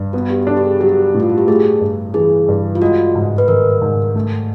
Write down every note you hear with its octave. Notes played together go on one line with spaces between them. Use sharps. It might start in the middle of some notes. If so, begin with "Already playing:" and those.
Already playing: G2
B3 F#4
G4
D4 A4
G4
G#4
F#3 G4
A2
F4
F#4
G4
A3 G#4
G2
E3 G#4
G2
F4
G#3 F#4
G#2
B4
D#3 A#4
G#2
A3